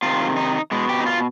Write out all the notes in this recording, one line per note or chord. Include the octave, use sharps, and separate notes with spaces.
C3 D#3 F4
D#4
B2 G#3
G4
D#4
F4